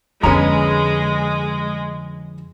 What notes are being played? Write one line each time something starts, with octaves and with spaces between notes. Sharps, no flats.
F2 D3 G#3 B3 C#4 A#5